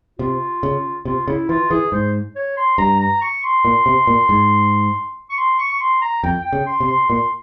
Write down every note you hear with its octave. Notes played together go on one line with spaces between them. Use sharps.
C3 F4
C#3
C3 F4
C#3 E4
E3 F4
E3 G#4
G#2 C5
C#5
C6
G2 A#5
A#5
C#6
C6
A#2
C3
A#2
G#2
C#6
C6
C#6
C#6
C6
A#5
F2 G5
G5
C#3
C6
C3
C6
A#2 C6